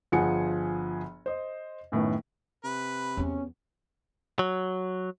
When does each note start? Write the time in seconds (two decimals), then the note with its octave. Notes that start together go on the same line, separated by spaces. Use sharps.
0.12 G1 F3 G#4 F#5 G#5 C#7
1.26 C5 D#5
1.92 F#2 A2 D#3 B3
2.64 C3 B4
3.17 E2 B3 C#4
4.39 F#3